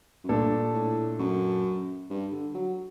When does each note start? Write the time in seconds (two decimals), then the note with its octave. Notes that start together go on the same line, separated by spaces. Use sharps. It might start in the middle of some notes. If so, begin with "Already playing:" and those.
0.24 F#2
0.29 G2 A#2 A3 D4 A4
0.74 A2
1.19 F#2
2.10 G2
2.32 D3
2.55 F#3